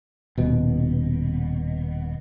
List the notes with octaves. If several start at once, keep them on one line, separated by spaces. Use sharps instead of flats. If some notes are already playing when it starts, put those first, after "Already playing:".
D#1 B2